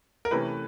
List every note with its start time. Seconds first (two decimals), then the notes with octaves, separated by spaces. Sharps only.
0.25 A#4
0.31 C3 E3 A3 C#4 B4